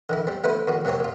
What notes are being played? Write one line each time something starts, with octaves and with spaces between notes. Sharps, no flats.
D3 D#3 E4
G3 C4
D3 A3 E4 B4 C5
A2 D#3 F#4
C3 F#3 A#3 C4 C#5
A#2 F4